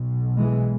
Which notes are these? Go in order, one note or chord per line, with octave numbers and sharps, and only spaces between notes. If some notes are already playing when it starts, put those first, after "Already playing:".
Already playing: B1 B2
E3 G#3